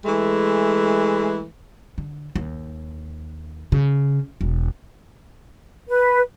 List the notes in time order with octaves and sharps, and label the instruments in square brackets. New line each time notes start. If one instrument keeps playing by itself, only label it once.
[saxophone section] E3 G#3 A3
[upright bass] D3
D#2
C#3
E1
[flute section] B4